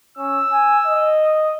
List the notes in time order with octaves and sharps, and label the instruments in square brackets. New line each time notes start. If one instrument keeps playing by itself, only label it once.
[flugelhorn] C#4 [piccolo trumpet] E6
[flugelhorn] G#5
D#5